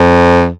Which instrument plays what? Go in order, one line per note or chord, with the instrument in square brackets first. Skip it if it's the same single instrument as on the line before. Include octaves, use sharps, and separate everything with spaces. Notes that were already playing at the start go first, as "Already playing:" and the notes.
Already playing: [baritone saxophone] F2